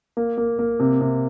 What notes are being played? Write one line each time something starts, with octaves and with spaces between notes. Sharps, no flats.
A#3
A#3
A#3
C3
C3